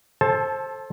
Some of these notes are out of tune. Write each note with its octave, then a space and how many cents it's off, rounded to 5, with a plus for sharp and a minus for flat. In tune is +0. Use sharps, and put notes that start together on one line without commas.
A4 +0 C5 +25 A5 -20